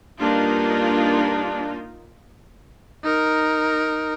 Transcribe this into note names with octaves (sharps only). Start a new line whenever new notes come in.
G2 A#3 D4 D#4 F4
D#4 A#4